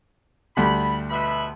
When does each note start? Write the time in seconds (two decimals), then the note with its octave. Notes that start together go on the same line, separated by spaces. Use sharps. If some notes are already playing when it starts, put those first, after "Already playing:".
0.57 D2 G3 B5
1.11 B2 E5 B5